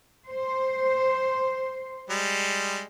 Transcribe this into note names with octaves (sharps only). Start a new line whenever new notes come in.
C5
G3 G#3